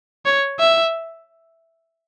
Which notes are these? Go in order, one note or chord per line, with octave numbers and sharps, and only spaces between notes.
C#5
E5